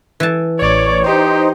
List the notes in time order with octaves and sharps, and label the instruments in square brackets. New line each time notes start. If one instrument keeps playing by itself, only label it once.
[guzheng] E3 A5
[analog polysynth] A1 C#5 [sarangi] D5
[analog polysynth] D#4 C5 [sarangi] G4